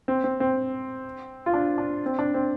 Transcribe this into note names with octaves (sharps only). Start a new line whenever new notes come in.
C4
C4
C4
F4
D4
D4
C4
D4
C4